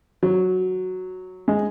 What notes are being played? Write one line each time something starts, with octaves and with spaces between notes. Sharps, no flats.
F#3
G#3